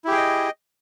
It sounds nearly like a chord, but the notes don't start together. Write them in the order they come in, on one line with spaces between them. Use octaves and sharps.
E4 G4 G#4 G5 D#5